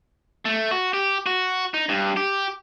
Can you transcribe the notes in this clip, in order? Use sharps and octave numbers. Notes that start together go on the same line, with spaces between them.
A3
F#4
G4
F#4
D#4
G2
G4